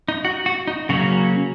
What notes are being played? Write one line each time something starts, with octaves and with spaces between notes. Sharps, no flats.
D#4
F#4
F#4
D#4
C#3 F#3 A#3 C#4 F#4